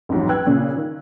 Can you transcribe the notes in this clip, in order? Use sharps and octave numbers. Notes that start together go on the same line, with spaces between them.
A1 F2 G#2 F#3
B4 G5 E6 F#6 G#6
A#2 C#3
D#3